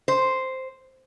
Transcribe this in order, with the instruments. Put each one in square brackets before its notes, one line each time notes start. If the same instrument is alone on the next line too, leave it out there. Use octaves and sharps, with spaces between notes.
[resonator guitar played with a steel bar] C5